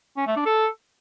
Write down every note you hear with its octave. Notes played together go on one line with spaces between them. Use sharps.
C#4
A3
D4
A4